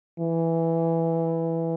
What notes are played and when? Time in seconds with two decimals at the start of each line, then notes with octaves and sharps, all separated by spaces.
0.20 E3